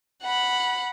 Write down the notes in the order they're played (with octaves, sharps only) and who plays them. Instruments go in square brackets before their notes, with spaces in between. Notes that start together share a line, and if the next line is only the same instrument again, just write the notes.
[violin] F#5 B5